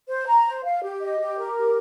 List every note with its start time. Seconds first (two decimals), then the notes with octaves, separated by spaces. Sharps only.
0.08 C5
0.28 A#5
0.45 C5
0.64 F5
0.83 G4
1.01 D#5
1.20 G4
1.38 A#4
1.57 G4